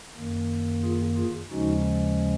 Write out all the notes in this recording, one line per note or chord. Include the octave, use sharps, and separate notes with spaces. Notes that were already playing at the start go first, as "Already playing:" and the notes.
F#2 D#3 A#3
F4 G#4
F4 G#4
D#2 C#3 F3 G#3 C#4 D#4 F#4